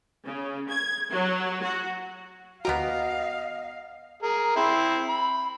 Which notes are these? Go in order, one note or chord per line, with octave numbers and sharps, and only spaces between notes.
C#3
G#6
F#3
F#4
D2 B3 F#4 G4 A#4 D#5 F5
G#4 A#4
C4 E4
B5